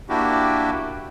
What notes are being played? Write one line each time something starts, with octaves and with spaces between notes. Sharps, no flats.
A#3 D4 E4 F#4 G4